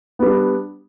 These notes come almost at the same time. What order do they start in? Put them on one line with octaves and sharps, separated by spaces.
B3 G3 D4